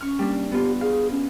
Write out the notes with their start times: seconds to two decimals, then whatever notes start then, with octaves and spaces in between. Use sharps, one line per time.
0.01 C#4 C#6 F6
0.19 G3 A#3 D4
0.52 B3 F4 G4
0.81 G#4 F5
1.12 C#4